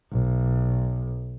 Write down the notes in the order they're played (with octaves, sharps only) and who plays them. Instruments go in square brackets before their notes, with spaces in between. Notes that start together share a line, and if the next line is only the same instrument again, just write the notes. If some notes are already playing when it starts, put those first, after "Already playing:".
[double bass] B1